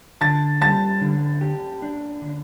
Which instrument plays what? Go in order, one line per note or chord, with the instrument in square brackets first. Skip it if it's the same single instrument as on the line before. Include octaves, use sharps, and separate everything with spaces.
[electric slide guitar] D3 [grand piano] A5 A6
[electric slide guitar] G3 [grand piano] A5 A6
[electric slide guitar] D3
G4
D4
D3